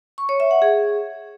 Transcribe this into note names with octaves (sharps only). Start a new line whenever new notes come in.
C#6
C#5
E5
F#5
G#4